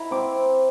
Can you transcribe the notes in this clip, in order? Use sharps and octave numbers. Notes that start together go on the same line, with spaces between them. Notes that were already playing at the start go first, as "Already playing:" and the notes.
Already playing: E4 A#5
C4 D6